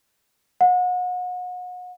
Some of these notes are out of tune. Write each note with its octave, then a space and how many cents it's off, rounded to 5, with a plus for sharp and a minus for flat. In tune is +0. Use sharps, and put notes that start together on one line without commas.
F#5 -35